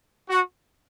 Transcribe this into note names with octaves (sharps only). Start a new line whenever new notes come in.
F#4